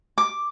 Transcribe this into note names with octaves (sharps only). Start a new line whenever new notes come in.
D6